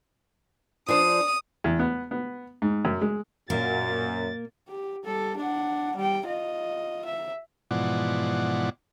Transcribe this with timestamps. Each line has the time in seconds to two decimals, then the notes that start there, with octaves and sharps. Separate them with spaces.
0.88 F3 D4 C5 D#6
1.64 E2
1.79 B3
2.11 B3
2.62 G#2
2.85 F#2
3.01 G#3
3.50 F#2 A#2 A#3 A6
4.68 G4
5.05 G3 A4
5.37 D4 F#5
5.96 G3 G5
6.26 F4 D#5
7.05 E5
7.71 G#2 B2 E3 F3 D5 F#5